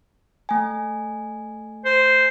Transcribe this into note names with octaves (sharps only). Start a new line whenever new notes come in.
A3 G#5
C5